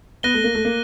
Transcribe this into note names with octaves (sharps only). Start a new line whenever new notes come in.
B3 F#6 A#6 D#7 G7
A3
A#3
A3
A#3